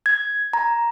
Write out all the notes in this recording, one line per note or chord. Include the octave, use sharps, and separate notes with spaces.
G#6
A#5